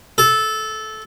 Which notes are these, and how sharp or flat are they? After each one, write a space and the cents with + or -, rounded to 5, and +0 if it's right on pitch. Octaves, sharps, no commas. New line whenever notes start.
A4 -15